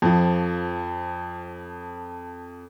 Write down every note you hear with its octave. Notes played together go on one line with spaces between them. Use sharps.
F2 F3